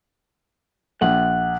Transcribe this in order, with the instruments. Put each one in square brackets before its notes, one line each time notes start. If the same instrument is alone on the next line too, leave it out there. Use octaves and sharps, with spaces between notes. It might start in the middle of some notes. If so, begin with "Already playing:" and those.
[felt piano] A#1 [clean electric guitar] F#5